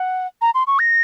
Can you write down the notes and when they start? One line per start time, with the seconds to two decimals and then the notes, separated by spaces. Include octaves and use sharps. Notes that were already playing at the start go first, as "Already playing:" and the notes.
Already playing: F#5
0.42 A#5
0.55 C6
0.67 C#6
0.79 A#6